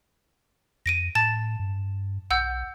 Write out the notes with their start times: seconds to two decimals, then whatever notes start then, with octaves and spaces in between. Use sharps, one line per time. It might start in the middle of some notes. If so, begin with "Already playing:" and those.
0.86 F2 A#6 D7 D#7
1.15 A2 A5 A6 E7
1.59 G2
2.31 B1 F#5 E6 G6